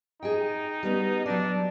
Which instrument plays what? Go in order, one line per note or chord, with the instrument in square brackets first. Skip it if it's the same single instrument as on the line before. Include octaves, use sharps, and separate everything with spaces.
[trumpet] D#4 [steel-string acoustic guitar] G#4 D#5 G5
[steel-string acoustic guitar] G3 B3 C#4
[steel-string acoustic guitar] F#3 D5 [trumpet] D4